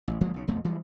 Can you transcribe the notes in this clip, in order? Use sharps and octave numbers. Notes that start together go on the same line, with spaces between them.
A1
G1 F3 G#3 A#3
B1 C#3
B1 F2 B2 A3
E3 F3 G3 G#3